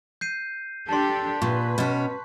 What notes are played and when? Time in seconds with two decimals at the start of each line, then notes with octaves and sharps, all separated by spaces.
0.21 G6 C7 D#7
0.89 D4 G4 A4 A5 C6
1.42 A#2 B4 C#6
1.78 B2 C#4